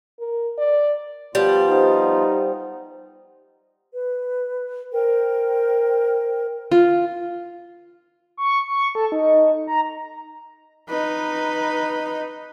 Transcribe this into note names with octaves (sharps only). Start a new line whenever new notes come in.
A#4
D5
F3 G3 B3 F4
D#4 G4 C5 F#5
B4
A#4 C5 G5
F4
C#6
C#6
A4
D#4
A#5
D#4 B4